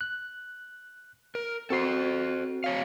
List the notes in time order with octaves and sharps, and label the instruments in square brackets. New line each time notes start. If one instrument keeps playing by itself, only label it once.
[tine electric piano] F#6
[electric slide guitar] A#4
[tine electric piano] C4 F#4 C7 [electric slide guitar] A4 C5
[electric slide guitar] F#3 C#5 F5